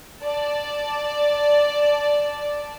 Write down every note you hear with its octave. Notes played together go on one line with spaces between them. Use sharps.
D5 A5